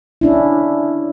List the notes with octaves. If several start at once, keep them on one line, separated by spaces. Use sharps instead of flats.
C#4 D4 E4